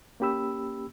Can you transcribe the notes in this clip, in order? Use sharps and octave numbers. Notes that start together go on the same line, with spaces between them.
A#3 C#4 G4 B5 E6